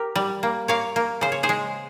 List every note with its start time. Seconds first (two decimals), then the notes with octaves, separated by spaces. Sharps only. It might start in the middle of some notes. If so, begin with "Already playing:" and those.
Already playing: G4 A#4
0.16 G3
0.43 A#3
0.68 A#3 C#5 F5
0.96 A#3
1.21 C#3 C5
1.32 C#5
1.43 G#4 C5
1.49 G#3